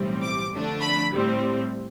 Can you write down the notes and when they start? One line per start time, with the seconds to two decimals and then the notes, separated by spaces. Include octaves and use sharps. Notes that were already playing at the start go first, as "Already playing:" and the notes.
Already playing: B1 A2 E3 G3 C4
0.22 D6
0.51 F2 D3 A3 D4
0.81 B5
1.10 A2 G3 C4